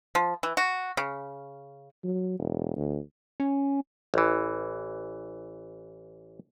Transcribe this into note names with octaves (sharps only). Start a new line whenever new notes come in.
F3
E3
F#4
C#3
F#3
E1
D2
C#4
A1 E3